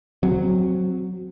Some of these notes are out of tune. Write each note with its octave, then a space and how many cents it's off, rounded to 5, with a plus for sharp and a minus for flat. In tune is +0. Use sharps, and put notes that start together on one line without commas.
F#3 +0 C4 +0